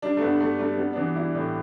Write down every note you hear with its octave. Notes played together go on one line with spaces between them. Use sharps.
G3 D4
A3
G2 B3
G2 A3
G3 A3
G3 B3
D4
E3 B3
G3 E4
A2 D4